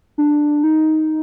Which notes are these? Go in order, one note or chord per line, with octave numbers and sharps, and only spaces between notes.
D4
D#4